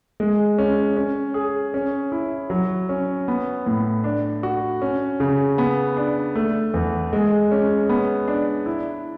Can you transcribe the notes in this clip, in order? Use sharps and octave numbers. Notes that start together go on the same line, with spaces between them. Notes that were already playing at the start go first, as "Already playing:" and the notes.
G#3
C#4
C#4
G#4
C#4
E4
F#3
C#4
B3
A2
D4
F#4
C#4
C#3
B3
D4
A3
E2
G#3
C#4
B3
D4
E4